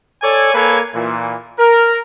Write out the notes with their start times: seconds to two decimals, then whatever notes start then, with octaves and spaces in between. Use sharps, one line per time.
0.22 A4 C#5 D5 G#5
0.54 A#3 A4 B4 C#5 G#5
0.93 A#2 E3
1.58 A#4